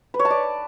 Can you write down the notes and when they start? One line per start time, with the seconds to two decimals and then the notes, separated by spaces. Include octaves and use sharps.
0.14 B4
0.19 C#5
0.25 A5
0.30 D5